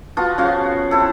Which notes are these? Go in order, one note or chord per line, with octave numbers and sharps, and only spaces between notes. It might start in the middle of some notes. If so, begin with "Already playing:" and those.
B3 F4 F#4 A5
C#3 F3 F#4 F5
C4 E4 A4